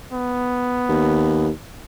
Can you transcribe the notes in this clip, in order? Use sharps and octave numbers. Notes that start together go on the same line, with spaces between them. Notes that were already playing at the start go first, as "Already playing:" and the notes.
B3
D#2